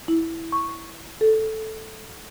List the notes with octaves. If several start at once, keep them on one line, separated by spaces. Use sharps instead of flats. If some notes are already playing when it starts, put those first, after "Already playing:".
E4
C#6
A4